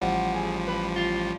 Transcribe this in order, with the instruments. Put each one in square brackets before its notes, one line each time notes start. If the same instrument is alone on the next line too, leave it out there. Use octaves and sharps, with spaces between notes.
[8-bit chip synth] A1 F3 G3 [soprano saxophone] F#5
[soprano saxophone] G#4
B4
F4